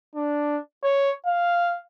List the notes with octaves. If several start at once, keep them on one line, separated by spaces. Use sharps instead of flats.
D4
C#5
F5